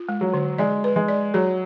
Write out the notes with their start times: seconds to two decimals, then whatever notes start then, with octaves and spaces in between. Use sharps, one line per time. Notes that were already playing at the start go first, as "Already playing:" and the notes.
Already playing: F4
0.09 G#3
0.21 F#3
0.34 D3
0.58 G#3 D5
0.84 B4
0.96 G#3
1.08 D5
1.34 F#3 G#4